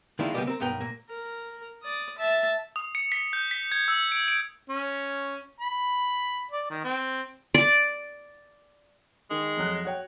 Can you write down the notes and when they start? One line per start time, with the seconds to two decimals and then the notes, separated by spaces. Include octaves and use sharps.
0.19 D#3 G#3 D4 E4 F4
0.34 C#3 G3 A#3 B3 G4 D#5
0.47 C4 A#4
0.60 B1 G2 B3 A#4 G5
0.80 A#2 A#3
1.09 A#4
1.82 D5 D#6
2.18 E5 A5
2.76 D#6
2.95 C#7
3.12 B6
3.33 G6
3.51 B6
3.72 G#6
3.88 E6
4.12 D7
4.28 D7
4.69 C#4
5.60 B5
6.51 D5
6.70 D#3
6.84 C4
7.54 D5
9.31 D#3 G#3
9.57 F2 F#3 F#6
9.85 F#4 C#5 G5